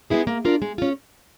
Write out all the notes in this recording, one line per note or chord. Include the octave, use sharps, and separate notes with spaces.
G#3 B3 E4 G#4
A#3
D4 F4 A#4 D5
G#3
C#4 F4